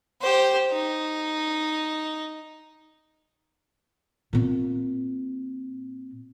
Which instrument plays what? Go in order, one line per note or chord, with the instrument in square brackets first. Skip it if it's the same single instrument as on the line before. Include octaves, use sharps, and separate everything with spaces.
[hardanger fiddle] G4 C5
D#4
[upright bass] A#2 C4